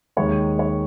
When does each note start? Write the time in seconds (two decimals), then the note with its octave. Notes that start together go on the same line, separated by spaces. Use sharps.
0.17 D#2 D#3 G#3 C#5
0.59 C#5